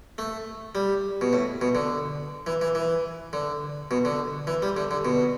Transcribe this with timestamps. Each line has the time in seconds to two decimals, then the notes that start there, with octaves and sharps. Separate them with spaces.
0.18 A3
0.75 G3
1.21 B2
1.33 A2
1.61 B2
1.75 D3
2.47 E3
2.61 E3
2.75 E3
3.33 D3
3.91 B2
4.05 D3
4.47 E3
4.62 G3
4.77 D3
4.91 D3
5.05 B2